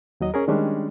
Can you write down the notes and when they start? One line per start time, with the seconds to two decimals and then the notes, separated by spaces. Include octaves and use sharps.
0.21 D#2 F#3 D#5
0.34 C#4 G#4 A#4
0.48 D#3 G3 G#3 C#4 D4